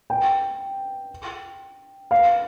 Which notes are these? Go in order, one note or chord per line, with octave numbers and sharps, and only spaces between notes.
G5
F5